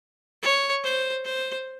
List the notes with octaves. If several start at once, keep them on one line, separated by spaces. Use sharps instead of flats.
C#5
C5
C5